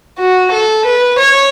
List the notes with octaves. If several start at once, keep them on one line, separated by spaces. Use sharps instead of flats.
F#4
A4
B4
C#5